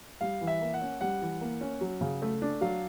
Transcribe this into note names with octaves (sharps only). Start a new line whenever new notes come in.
G3 F5
E3
E5
A#3
F#5
C#4
G3 F#5
E3
A#3
C#4
F#3
C#3
A3
D4
F#3 F5